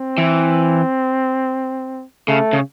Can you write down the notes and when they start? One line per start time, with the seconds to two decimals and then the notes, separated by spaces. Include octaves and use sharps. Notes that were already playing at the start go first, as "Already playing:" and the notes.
Already playing: C4
0.18 E3
2.28 C#3 A3
2.53 C#3